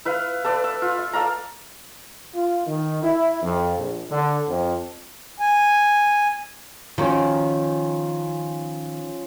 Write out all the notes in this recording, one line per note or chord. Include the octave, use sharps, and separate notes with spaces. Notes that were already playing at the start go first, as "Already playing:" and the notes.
E4 B4 F5
A4 B4 D5
E6
F4
E5
A4 D5 F5 A#5
F4
D#3
E4
F2
A#1
D3
F2
G#5
D#3 F3 C#4 F#4